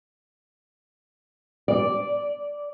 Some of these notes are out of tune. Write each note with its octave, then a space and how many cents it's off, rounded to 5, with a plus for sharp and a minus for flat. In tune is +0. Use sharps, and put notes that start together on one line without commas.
D5 -10